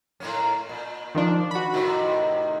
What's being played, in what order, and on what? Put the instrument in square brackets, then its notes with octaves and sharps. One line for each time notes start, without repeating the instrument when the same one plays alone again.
[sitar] A2 A#3 C#4
A#2
[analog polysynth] D#3 F3 D4
F#4 B5
[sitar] A2 C3 D#3